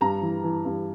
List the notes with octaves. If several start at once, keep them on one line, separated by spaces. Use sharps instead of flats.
G2 A#5
E3
E3
G2